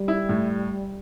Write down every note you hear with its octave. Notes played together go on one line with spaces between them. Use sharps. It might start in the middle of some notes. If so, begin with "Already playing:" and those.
Already playing: G3
E4
A2